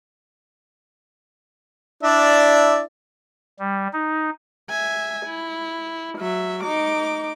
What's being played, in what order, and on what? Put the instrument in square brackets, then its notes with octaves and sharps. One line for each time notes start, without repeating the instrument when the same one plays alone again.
[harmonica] D4 E4 D5
[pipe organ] G3
D#4
[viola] E5 G#5
E4
F#3 E5
D#4 D6